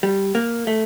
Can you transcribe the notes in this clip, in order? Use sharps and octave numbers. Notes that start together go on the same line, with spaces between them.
G3
A#3
A3